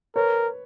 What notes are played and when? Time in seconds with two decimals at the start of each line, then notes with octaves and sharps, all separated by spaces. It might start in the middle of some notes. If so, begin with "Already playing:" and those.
0.16 A#4 B4 C#5